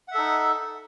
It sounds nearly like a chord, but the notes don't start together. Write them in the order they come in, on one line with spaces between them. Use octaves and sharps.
F#5 E5 A4 D#4